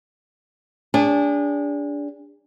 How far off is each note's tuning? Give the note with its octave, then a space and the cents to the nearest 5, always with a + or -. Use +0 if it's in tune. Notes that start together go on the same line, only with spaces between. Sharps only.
D4 -20 G#4 -40